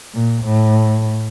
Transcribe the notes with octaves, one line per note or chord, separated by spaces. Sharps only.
A#2
A2